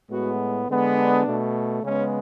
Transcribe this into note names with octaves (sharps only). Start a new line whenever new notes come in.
A2 G#3 B3 F#4
D3 G#3 B3
D4
B2 A3
C#3 G#3 B3 C#4